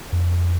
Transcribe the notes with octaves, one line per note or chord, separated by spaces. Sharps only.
F2